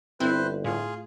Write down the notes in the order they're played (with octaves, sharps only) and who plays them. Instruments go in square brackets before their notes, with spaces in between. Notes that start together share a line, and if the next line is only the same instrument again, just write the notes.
[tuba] G1 [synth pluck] C4 E4 G5 [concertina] B4 C5
[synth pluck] A2 [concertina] F4 G#4